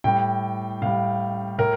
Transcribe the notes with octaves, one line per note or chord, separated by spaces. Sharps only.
A2 G3 G5
A2 G3 F5
A2 A#4